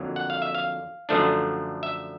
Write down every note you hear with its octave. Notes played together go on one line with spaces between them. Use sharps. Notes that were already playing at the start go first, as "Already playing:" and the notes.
Already playing: F2 D3 F#3 A#3
F#5
F5
E5
F5
F#2 D3 F3 A3 D4
E5